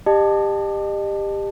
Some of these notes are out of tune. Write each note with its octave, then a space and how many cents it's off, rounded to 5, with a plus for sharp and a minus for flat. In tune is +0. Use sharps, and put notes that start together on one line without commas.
G4 +20 D#5 -35 A5 +0